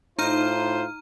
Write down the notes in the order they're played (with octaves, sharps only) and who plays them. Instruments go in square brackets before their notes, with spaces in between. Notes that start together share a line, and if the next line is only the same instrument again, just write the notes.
[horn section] A2 F4 C5 [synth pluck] D#4 [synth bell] A#5 F6 D#7